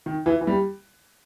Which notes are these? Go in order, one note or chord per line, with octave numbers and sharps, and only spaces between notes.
D#3
E3
E3
G3